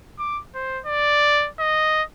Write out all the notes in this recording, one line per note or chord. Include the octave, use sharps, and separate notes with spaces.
D6
C5
D5
D#5